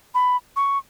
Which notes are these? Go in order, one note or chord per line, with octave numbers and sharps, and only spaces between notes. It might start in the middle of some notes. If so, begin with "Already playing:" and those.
B5
C#6